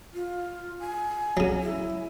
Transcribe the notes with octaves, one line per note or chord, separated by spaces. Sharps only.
F4
G#5
C#3 F#3
E4